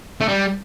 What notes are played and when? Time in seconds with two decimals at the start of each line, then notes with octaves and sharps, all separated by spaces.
0.21 A3
0.28 G3